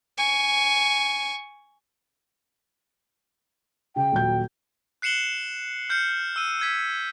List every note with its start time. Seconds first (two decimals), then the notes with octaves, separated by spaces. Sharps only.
0.17 G#5 C#6
3.96 C#3 G5
4.12 D#1 F#3 G6
5.02 F#6 C7 C#7 E7 F#7 G7
5.89 F6 G6 C7 C#7
6.36 E6 D#7
6.60 E6 G#6 B6